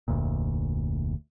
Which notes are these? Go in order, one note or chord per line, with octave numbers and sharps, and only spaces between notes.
F1 D2 A#2